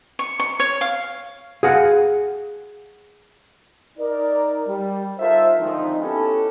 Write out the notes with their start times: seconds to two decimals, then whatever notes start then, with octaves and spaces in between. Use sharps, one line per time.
0.19 C#6
0.40 C#6
0.60 C#5
0.81 F5
1.63 G#4 F5 F#5
3.98 D#4 A#4 D5
4.67 G3
5.18 D#4 F4 A4 A#4 C5 E5
5.58 D3 D#3 F3 G#3 C4 D#4
5.99 B3 C#4 E4 G4 A4